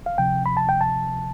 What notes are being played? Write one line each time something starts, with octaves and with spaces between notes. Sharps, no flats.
F5
D2 C3 F3 G5
B5
A5
G5
A5